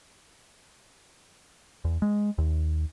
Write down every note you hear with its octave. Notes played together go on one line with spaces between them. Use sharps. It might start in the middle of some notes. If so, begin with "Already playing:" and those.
E2
G#3
D#2